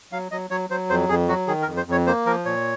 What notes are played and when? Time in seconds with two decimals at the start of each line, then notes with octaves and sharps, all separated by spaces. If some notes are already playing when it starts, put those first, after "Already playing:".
0.12 F#3 F5
0.31 F#3 D#5
0.50 F#3 C#5
0.70 F#3 C5
0.90 F2 C5
1.09 F2 G#4
1.29 F#3 F#4
1.47 D#3 G#4
1.62 A#4
1.67 F2
1.77 C5
1.88 F2 C#5
2.07 A#3 C5
2.26 F3 A#4
2.45 A#2 C#5